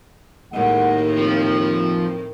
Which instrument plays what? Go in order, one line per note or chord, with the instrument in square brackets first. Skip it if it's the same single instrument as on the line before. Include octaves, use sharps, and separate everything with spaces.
[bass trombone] D#2 [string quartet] A2 D#3 [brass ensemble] G#3 F#5
[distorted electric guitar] F3 [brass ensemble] C4